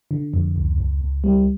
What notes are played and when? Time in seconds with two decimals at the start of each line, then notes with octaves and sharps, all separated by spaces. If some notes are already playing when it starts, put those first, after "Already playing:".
0.11 D3
0.34 F2
0.56 C#2
0.78 C#2
1.01 C#2
1.24 G3